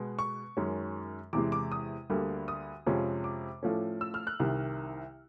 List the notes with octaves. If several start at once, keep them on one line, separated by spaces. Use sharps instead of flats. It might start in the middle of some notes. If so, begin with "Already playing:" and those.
Already playing: B2 G#3 B3
C#6
F#2 D#3 G#3 C#4
E2 C3 E3 G#3 D6
D6
D#6
D2 D3 G3 A#3
D#6
F2 C3 F3 G#3 C#4
D6
A2 F3 A3 C#4
E6
F6
F#6
C2 C3 D#3